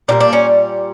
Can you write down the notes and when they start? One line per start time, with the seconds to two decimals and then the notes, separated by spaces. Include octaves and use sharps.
0.08 A#2 G3 A#3 D4
0.20 D4
0.33 C#4